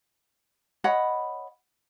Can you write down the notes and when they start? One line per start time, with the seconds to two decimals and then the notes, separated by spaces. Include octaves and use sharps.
0.84 C#5 D#5 F#5 B5